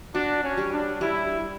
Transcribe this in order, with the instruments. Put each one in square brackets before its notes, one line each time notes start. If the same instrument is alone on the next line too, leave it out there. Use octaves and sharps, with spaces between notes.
[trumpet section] D4 [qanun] F#4
[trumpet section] C#4
[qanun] G3
[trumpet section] D4
[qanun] G3 [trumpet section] E4